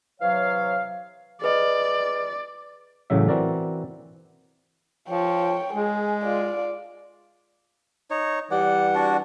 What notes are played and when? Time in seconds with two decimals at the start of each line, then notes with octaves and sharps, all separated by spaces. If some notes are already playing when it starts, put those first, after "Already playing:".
0.20 C3 E3 F#3 C#5 F5
1.42 G#4 B4 D5 D#5
3.10 A1 A2 C#3 F#3 E5
3.28 E3 C4 F#4 A#4 D5
5.09 F3 C#5 G5
5.73 G#3 G#4
6.24 F4 D5
8.11 D#4 C#5
8.51 E3 G3 D5 F#5
8.95 D4 F#4